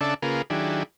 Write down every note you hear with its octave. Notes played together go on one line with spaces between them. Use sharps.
C#3 D4 A4 D5 E5 A5
C#3 A#3 F4 G#4 A#4 B4
D#3 F#3 D4 E4 G4 G#4